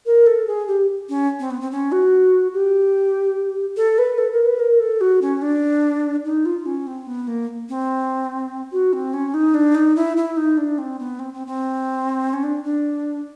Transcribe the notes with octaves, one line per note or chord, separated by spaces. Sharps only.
A#4
A4
G#4
G4
C#4
C4
B3
C4
C#4
F#4
G4
A4
B4
A4
A#4
B4
A#4
A4
F#4
C#4
D4
D#4
F4
C#4
C4
B3
A#3
C4
F#4
C4
C#4
D#4
D4
D#4
E4
E4
D#4
D4
C4
B3
C4
C4
C4
C#4
D4
D4